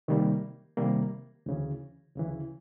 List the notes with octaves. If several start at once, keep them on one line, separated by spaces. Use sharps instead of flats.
C3 D#3 G3 A#3
C3 D#3 G3 A#3
D2 C#3 E3
D2 C#3 E3